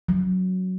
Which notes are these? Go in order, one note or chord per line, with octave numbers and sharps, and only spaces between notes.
F#3